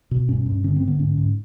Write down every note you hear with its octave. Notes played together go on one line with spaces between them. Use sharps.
B2
G2 C#4
G2
D3 C#4
C4
D3
B3
G#2 C#4
G#2